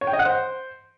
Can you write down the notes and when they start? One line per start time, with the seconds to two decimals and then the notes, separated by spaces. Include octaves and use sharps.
0.01 C#5
0.07 G5
0.13 D#5
0.19 F#5
0.25 C5